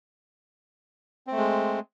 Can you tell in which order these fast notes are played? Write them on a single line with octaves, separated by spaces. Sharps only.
C4 A3 G#3